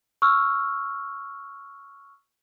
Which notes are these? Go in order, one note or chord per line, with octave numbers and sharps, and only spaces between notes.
C#6 E6 F6